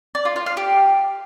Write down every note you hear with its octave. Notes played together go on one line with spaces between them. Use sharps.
D5
F4
F4
F5
G4